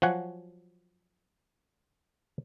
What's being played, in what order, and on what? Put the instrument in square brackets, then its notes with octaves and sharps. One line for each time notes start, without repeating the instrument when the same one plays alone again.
[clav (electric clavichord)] F3 F#3 F#4 F#5 G#5